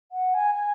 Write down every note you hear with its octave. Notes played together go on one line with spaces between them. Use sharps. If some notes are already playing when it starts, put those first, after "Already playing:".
F#5
G#5
G#5